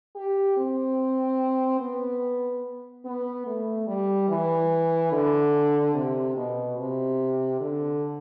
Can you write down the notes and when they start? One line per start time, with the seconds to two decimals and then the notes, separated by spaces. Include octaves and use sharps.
0.16 G4
0.57 C4
1.80 B3
3.05 B3
3.46 A3
3.87 G3
4.29 E3
5.12 D3
5.94 C3
6.36 B2
6.77 C3
7.60 D3